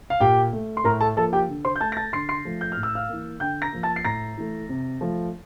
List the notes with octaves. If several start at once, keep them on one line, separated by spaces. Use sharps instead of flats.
F5
A#2 G4 G5
A3
C6
A2 A#4 A#5
A4 A5
F3 A#3 A4 A5
G4 G5
D3
C5 C6
G6
A3 A5 A6
A#6
A5 A6
D3 C6 C7
C6 C7
F3 A3
G6
F6
A2
E6
F5 F6
E3 A#3
D3 G5 G6
A#5 A#6
F3 A#3
A5 A6
C7
A2 A#5 A#6
E3 A3
C3
F3 A3